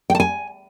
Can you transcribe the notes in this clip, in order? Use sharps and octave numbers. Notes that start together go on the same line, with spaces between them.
G5
A5
G#5